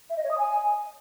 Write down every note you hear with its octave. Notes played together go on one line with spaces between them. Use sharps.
E5
D#5
C#5
D#6
G#5